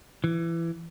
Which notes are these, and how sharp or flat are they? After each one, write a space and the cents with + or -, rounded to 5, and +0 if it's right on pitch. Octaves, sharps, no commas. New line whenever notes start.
E3 +20